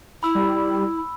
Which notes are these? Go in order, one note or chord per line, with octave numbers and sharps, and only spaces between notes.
E4 B5 E6
G3